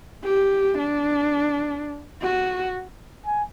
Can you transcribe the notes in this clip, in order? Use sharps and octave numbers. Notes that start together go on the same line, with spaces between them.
G4
D4
F#4
G#5